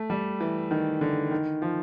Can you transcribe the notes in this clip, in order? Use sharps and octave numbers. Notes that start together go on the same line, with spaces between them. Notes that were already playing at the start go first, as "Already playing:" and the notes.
Already playing: A3
G3
E3
D#3
D3
D#3
F3